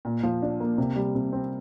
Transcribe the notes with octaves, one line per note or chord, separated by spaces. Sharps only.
A#2
F3
D4
A#3
C3
G3
C3
C4